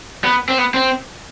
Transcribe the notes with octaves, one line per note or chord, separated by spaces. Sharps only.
B3
C4
B3
C4